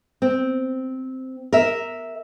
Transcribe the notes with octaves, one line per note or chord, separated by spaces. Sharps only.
C4
A#4 E5